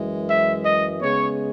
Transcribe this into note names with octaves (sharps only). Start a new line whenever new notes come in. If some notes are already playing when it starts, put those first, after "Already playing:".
Already playing: F#2 E3 G#3
E5
D#5
C#3 G#3 B3 C#5